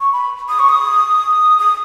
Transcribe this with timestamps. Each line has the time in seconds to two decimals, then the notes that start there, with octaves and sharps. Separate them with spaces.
0.01 C#6
0.13 B5
0.49 D#6
0.59 C#6
0.69 D#6
1.59 D#6